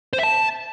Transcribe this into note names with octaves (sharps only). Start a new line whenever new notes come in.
C5
E5
A5